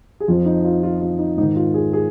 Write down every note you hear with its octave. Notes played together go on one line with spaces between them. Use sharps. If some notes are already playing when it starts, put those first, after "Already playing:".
G#4
F2 F3 F4
D#4
F4
F4
F4
D#4
G#2 D#3 D#4
F4
G#4
G#4